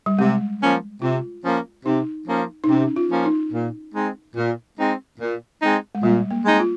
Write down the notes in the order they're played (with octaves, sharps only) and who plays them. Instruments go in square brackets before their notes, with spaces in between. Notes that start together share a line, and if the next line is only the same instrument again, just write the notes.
[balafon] G3
[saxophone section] C3 [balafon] G#3
[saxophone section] F3 A#3 C#4
[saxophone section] C3 [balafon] F4
[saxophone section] F3 A#3 C#4
[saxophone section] C3 [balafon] D#4
[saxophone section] F3 A#3 C#4
[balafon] D#4
[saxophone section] C3 [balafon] C#4
[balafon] F4
[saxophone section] F3 A#3 C#4
[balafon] D#4
[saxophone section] A#2
G#3 C4 D#4
A#2
G#3 C4 D#4
A#2
G#3 C4 D#4
[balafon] G#3
[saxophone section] A#2 [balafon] G3
[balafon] A#3
[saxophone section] G#3 C4 D#4
[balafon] F4